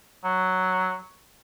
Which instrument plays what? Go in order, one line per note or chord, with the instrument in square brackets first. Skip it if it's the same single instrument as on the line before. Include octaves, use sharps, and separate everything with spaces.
[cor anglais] F#3